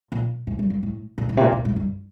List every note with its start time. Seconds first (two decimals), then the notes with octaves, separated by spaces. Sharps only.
0.12 A#2
0.47 A2
0.59 G2
0.70 G2
0.83 A2
1.18 A#2
1.29 A2
1.37 C3
1.41 A#2
1.52 A2
1.65 A2
1.76 G2